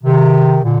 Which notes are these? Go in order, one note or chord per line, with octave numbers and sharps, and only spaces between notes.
C3 D#3
A#2 D3